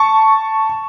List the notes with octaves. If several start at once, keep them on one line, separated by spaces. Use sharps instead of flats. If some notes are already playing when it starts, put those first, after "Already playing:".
Already playing: A5 C#6